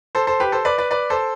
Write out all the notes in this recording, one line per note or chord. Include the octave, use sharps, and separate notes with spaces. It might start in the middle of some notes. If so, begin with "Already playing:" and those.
A4 C5
A4 C5
G4 B4
A4 C5
B4 D5
B4 D5
B4 D5
A4 C5